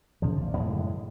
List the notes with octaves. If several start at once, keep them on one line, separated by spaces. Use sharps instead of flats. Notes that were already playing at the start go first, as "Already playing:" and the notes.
F2 C#3 E3 F3
A#1 A#3
F#2 A2 D3 G#3